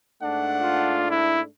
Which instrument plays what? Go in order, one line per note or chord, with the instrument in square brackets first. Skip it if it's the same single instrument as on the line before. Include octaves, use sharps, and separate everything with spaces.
[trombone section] G#2 A3 D4 [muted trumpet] F#5
[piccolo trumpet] F4
E4